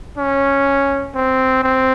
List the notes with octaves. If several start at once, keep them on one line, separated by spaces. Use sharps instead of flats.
C#4
C4
C4